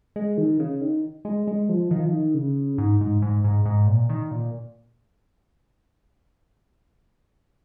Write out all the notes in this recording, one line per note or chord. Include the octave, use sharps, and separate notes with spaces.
G#3
D#3
C#3
D#3
G#3
G#3
F3
D#3
F3
D#3
C#3
G#2
G#2
G#2
G#2
G#2
A#2
D#3
A#2